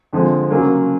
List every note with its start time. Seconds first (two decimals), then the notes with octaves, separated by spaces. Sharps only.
0.13 F2 D3 F3 G#3
0.51 C#3 F#3 A#3 C#4